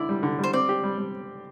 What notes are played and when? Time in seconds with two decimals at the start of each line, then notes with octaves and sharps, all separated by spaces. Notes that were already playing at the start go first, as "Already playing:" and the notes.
Already playing: D3 E4 D5
0.09 G3
0.23 D3
0.39 G3 C5
0.53 C4 D5
0.69 G4
0.84 G3
0.98 G3